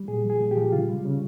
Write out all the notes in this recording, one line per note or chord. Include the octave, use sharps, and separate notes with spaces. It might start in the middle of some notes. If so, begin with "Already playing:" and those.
Already playing: G3
A#2 G#4
F3 G#4
A#2
G4
F3
C#3 F4
G3
C#3